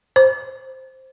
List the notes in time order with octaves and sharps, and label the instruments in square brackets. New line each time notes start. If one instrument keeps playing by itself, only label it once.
[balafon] C5